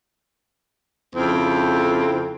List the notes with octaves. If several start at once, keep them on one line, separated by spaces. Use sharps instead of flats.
F2 C#3 C4 E4 A4